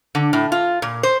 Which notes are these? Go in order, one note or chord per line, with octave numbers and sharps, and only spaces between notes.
D3
A2
F4
A#2
C5